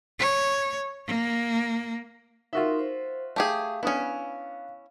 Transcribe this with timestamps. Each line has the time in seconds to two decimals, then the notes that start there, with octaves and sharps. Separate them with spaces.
0.19 C#5
1.07 A#3
2.53 D#4 F4 F#4 A#4 E5 C6
2.79 C5
3.36 A3 G4 G#4 F5
3.83 B3 C#4 D4 E4 D#6